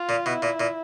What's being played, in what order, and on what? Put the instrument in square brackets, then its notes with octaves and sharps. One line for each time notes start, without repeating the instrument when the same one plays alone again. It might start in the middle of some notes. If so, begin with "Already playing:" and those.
Already playing: [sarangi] F4
[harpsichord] A#2
[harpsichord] B2 [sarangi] E4
[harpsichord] A#2
A#2